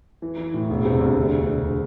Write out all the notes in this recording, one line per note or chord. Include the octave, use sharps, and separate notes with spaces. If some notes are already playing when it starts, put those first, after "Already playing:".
E3
E3
A2
E1
C3
D2
E1
E1
E1